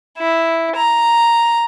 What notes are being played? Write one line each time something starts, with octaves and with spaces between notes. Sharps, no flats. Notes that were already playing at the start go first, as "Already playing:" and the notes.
E4
A#5